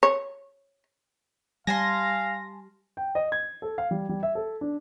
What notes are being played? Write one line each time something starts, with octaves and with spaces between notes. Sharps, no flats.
C#5
G3 F5 G#5 A5 C6 A#6
G5
D#5
G#6
A4
F5
G3
G3
E5
A4
D4